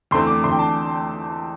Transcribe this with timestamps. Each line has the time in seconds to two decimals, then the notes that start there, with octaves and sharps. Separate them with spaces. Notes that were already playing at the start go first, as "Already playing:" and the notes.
0.11 E2 D3 A3 C4 C6
0.27 D6
0.43 E2 D3 A3 C4 C6
0.52 G5
0.59 A5